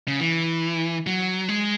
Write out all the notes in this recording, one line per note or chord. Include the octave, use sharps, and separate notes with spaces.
C#3
E3
F#3
G#3